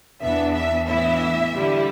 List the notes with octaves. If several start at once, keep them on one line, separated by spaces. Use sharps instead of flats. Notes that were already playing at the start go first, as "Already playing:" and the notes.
E2 E3 B3 D4 E5
E5
A2 E3 B3 E4 E5
D3 G3 E4